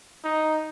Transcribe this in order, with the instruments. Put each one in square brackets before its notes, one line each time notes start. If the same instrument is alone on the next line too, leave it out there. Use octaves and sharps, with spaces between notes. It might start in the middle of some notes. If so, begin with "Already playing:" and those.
[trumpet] D#4